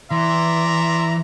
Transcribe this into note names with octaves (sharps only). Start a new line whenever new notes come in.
E3 D5 E5 A#5 C6